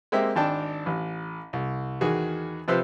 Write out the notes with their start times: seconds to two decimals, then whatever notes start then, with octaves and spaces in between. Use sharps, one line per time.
0.12 G#3 A#3 C4 G4 E5
0.36 G#1 D4 G5 A5
0.86 A1
1.53 C2
2.01 E2 D#3 F#4 G#4
2.68 C3 F3 B4 C5 E6